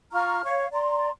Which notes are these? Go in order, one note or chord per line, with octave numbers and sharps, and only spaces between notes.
F4 A#5 C#6 F6
C#5 F5 C#6
D5 A#5 C6